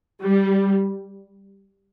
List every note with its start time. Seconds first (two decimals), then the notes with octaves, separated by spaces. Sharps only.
0.22 G3